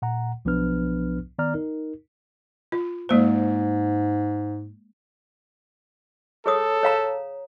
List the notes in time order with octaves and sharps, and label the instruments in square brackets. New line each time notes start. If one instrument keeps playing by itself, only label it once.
[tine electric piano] A#2 F#5 A#5
B1 F3 B3 D4 B4 F6
D#3 B3 D5 A#5 F6
D#4 A#4
[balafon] F4
[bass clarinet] G#2 [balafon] G#3 A#3 C5
[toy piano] G#4 C#5 D#6 [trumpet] A4
[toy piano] C#5 F5 A#5